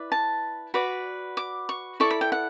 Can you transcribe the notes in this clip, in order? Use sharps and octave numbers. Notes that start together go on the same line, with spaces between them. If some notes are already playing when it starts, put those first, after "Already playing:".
Already playing: E4 B4 D5
A5
F#4 B4 D5 B5
D6
C#6
E4 A4 D5 C#6
B5
G5
F#5